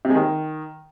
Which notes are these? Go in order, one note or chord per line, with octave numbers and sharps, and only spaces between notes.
C3
G#3
D#3